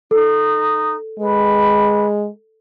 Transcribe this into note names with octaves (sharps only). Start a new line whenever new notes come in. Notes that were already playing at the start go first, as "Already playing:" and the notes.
D#4 A4
G#3 B4